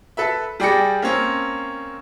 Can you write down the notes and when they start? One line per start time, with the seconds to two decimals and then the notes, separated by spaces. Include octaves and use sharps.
0.17 A4 B4 E5
0.60 G3 G#4 D5 G5 A#6 C#7
1.02 A#3 C4 C#4